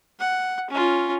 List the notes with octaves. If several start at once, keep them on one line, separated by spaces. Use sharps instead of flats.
F#5
C#4 F4